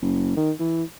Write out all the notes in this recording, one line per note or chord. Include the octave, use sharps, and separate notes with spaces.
F#1
D#3
E3